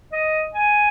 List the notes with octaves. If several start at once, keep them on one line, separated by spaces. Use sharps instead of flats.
D#5
G#5